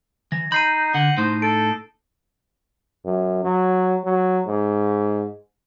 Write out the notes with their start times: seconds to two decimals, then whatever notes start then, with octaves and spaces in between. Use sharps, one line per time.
0.32 E3 A#6
0.52 D#4 B5 G6 C7 D#7
0.94 D3 F#5
1.18 A2 D#4 C5
1.42 A4 D7
3.05 F#2
3.44 F#3
4.05 F#3
4.47 G#2